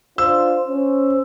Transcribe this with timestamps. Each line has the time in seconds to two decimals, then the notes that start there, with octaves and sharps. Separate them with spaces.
0.18 D4 F4 C5 E6
0.67 C#4 C5